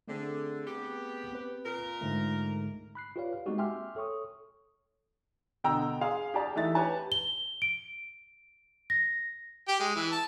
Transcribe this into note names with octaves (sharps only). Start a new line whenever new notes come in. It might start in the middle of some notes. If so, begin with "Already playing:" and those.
D3 A3 C4 G#4
B3 G4
C4 B4
A#2 A#4
G#2 D3 A3
B5 F#6 C7
F4 G4 B4 C#5 D5 F5
F5
G#3 A#3 C4 D#4 F#4 G4
E5 G5 G#5 C6 D6 F6
A4 C#5 C#6 D#6
B2 D3 G5 A#5 E6
G#4 F5 C6
G4 G#4 D5 A5
E3 A3 D#4 E5 A6
G4 B4 C#5 G#5 A5
G7
D7
A#6
G4 G5
G#3
E3
A5